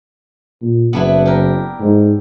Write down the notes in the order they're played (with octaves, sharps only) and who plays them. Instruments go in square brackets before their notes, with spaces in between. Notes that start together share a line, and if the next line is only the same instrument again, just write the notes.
[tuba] A#2
[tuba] F#1 [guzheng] B3 D4 E4
[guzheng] G4 A#4
[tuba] G#2